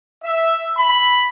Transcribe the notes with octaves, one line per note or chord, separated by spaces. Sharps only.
E5
B5